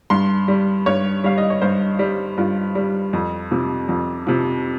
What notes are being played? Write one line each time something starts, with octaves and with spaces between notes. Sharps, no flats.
G2 C6
G3
G2 C#5
G3 F5
D#5
C#5
G2 C5
G3
G2 F4
G3
F2
C3 F3
F2
C3 F3